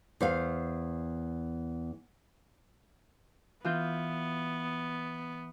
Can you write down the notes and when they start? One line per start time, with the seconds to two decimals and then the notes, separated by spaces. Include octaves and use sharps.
0.21 E2 C5 F5
3.64 E3 B3 F4 G6